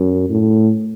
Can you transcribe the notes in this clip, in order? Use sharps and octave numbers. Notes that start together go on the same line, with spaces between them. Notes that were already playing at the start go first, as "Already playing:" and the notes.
Already playing: F#2
A2